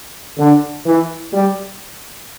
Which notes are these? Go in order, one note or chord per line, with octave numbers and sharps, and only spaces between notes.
D3
E3
G3